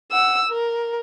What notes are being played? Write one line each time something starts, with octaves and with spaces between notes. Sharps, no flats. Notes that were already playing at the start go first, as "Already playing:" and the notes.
F#5 E6
A#4